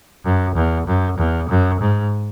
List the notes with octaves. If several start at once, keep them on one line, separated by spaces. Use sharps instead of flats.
F#2
E2
F#2
E2
F#2
G#2